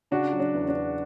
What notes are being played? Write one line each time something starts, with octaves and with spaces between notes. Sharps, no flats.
C#3 D4 F#4
F#3
D4
E2
D4
E2